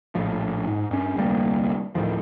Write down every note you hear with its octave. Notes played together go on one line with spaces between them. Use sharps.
A#1 A2 F3
G#2
G2 C#4
F1 D2 G3 A#3
D1 A2 D#3 F3